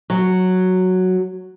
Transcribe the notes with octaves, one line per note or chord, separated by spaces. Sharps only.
F#3